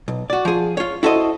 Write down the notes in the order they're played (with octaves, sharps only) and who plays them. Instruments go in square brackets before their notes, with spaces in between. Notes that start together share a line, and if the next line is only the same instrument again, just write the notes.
[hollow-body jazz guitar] B1
F#4 D5
F3 G#4
F4 C#5
E4 F#4 A4 C5 C#5 D#5